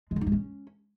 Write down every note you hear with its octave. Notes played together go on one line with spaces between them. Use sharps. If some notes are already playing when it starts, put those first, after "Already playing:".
G#3
D3
D#4
G#3
C#4